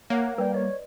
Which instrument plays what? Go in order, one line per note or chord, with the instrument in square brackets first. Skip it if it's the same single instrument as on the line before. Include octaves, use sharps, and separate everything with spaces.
[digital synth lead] A#3 [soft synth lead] C#5 [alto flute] F#5
[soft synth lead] G3 [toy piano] B4 D5 [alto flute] G5
[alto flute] C#5 [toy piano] D#5